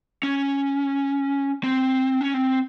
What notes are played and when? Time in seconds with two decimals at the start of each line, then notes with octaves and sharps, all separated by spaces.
0.23 C#4
1.64 C4
2.21 C#4
2.34 C4